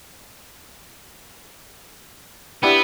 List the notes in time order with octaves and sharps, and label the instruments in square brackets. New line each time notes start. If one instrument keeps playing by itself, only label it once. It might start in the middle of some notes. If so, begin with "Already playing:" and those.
[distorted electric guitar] B3 [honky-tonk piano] D4 E4 G4